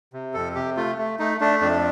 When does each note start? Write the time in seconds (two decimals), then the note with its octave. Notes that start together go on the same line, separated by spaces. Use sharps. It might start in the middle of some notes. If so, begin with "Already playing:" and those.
0.13 C3
0.34 F2 A4
0.55 C3 G4
0.77 A3 F4
0.98 A3
1.19 A3 D#4
1.41 A3 D4
1.61 F2 D4